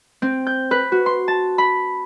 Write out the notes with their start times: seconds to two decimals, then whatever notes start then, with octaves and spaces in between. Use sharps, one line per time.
0.22 C4
0.47 G6
0.71 B4
0.92 F#4
1.06 C6
1.28 A5
1.58 B5